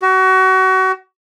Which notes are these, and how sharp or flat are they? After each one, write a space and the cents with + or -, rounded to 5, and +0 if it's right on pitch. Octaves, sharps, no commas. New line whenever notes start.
F#4 +30